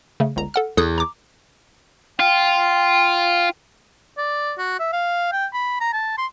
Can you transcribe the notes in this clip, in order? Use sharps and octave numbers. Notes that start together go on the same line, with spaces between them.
C#3 A3
G1 C#2 A#5
A4 F#5 F6
E2 A4 D#6 F#6
A#5 D6
F4 G5
D5
F#4
E5
F5
G5
B5
A#5
A5
C6